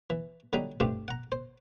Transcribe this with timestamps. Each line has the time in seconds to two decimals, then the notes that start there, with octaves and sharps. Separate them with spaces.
0.10 E3
0.53 D3 F#3 G3 D#4
0.80 G2 C3 A3 D4 F4 G4
1.08 F#5 A#5
1.32 C5